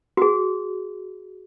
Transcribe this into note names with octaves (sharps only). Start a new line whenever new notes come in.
F#4 G#4